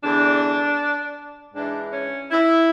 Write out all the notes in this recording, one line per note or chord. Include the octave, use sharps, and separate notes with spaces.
E2 D3 D4
G#2 E3 D4
C#4
E4